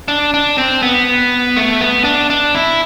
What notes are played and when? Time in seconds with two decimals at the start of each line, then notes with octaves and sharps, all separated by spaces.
0.08 D4
0.34 D4
0.58 C4
0.83 B3
1.56 A3
1.81 B3
2.04 D4
2.30 D4
2.55 E4